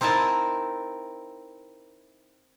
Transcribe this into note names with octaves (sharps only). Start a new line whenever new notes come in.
C4 D#4 E4 A#4 A5